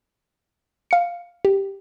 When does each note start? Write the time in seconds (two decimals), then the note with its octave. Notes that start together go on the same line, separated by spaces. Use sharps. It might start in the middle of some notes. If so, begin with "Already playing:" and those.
0.91 F5 C#7
1.45 G4